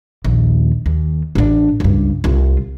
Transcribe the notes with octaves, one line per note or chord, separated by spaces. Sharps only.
A#1 D#2
D#2
A1 D4
C#2 G2
C2 F4